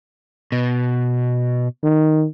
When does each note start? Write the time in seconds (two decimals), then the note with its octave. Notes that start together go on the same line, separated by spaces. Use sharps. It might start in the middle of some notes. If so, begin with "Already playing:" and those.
0.52 B2
1.83 D#3